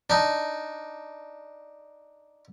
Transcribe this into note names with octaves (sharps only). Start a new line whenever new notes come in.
D4 D#4